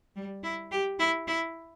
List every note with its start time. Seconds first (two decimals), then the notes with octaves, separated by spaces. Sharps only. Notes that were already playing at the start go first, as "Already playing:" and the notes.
0.16 G3
0.43 E4
0.71 G4
0.99 E4
1.27 E4